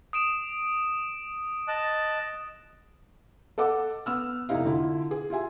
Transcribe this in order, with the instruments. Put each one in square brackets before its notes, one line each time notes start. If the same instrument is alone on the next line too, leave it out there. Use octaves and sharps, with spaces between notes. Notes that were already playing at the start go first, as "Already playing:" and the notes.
[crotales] D#6 D7 E7
[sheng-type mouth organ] D#5 A5 F#6
[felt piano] A4 D#5 F#5 D6 E6
B3 E6 F6
F1 C3 D#4 E4 F5
D3 E4 F4
G#4
F4 G4 E5 G#5